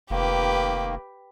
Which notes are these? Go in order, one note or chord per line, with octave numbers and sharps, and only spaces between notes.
F1 D#3 A#3 G4 B4